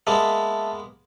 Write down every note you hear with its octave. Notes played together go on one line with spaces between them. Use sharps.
G#3 A#3 B3 E5 A5